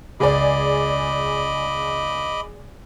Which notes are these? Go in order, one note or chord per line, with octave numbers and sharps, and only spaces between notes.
C#2 G#4 D5 D#5 B5 D6